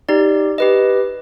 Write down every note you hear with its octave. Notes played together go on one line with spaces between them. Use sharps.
D#4 G4 D5
G4 B4 D#5